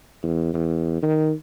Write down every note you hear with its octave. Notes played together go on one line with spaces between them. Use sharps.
E2
E2
D#3